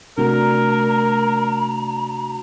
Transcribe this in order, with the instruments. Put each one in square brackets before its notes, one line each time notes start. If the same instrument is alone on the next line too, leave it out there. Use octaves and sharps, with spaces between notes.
[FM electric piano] C3 A3 F#4 [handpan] D4 [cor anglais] A#4 [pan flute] A#5